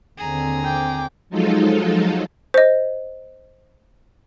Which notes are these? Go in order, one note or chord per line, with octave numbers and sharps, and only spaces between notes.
D#2 D3 C4 G#4 A#5
G5 D6
F3 F#3 G#3 D#4 F4 A4
C5 D#5